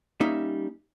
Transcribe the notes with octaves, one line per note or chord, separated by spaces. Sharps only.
G3 A#3 C#4 D#4 E5